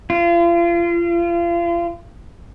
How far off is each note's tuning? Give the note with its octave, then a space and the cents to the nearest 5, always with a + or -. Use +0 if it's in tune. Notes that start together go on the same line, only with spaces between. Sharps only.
F4 -35